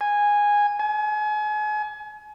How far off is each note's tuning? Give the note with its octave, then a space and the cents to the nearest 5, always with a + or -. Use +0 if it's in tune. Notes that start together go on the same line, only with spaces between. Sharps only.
G#5 -10
G#5 +35